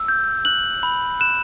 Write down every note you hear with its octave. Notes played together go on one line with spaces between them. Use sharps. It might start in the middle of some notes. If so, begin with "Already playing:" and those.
Already playing: E6
G6
F#6 F#7
B5
F#6 E7